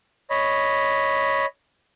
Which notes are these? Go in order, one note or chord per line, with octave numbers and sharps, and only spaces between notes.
C#5 D#5 B5